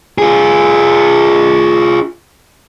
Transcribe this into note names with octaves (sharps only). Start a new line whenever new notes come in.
F4 G#4